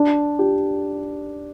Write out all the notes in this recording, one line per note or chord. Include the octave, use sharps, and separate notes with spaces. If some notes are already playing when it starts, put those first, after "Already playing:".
Already playing: D4
G4